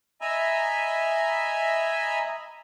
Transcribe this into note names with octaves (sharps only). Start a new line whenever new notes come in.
D#5 E5 G#5 A#5 B5 E6